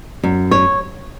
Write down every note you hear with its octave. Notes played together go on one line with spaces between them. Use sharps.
F#2
C#5